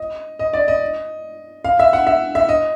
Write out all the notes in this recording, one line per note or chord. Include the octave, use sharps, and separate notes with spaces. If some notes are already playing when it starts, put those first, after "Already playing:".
Already playing: D#5
D#5
D5
D#5
F5
E5
F#5
E5
E5
D#5